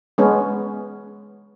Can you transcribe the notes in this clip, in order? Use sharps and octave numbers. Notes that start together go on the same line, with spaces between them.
G#3 B3 C#4